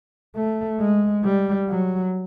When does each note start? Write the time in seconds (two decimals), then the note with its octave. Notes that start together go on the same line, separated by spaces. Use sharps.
0.36 A3
0.80 G#3
1.24 G3
1.70 F#3